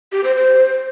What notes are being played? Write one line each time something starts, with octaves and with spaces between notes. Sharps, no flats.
G4
C5
C5